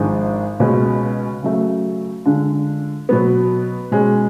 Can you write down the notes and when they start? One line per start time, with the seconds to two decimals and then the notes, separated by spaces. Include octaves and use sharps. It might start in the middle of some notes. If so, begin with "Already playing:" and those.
Already playing: G#1 G#2 F3 G#3 D4
0.60 C#2 B2 G#3 C#4
1.42 C#3 F#3 A3
2.26 D3 G#3 D4 F4
3.09 B2 F#3 B3
3.91 B2 G#3 C#4 G#4